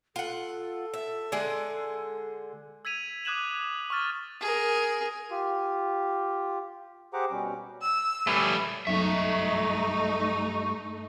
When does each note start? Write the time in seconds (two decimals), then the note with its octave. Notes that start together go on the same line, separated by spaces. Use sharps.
0.16 F4 A4 F#5
0.94 E5
1.32 D3 G#3 G#4
2.85 E6 G#6 B6 D#7 F7
3.25 D6 D#6 F#6 G#6 E7 F#7
3.90 C#6 D6 F6 A6
4.41 G#4 A#4
5.31 F4 G4
7.14 G4 G#4 C5 F#5 A#5 D6
7.31 B2 G3 C#4
7.82 E6
8.27 G3 A3 G#4 B4 C#5
8.87 F#1 B1 G2 A3 D#4 E5 C#6